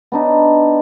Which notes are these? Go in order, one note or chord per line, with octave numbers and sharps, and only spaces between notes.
B3 D4 D#4